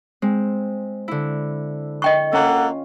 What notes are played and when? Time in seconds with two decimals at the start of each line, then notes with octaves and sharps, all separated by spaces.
0.22 G#3 C4
1.08 D3 E4
2.02 D#5 G5 C#6
2.33 A#3 C#4 F4 A4 F#5